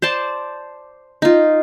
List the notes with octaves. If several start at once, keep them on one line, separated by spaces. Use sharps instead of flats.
C5 D5 A5 C6
D#4 F4